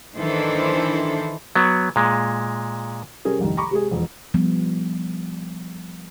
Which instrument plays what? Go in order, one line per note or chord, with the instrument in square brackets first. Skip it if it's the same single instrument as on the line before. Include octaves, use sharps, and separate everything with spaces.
[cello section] D#3 E3 D4 E4 A4 C5
[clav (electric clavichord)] F#3 B3
A#2 G#3
[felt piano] C3 G3 C#4 G#4 A#4
F1 C2 D#3
A#5 B5 C#6 D6
C3 G#3 G#4
E1 F2
[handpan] F3 G3 B3